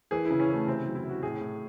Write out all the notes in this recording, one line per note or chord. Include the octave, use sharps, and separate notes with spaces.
E3 G#4
E4
C#3
C#4
E3 A3
C3 C4
F#3
E4
C3 F#4
A2 G#4
A2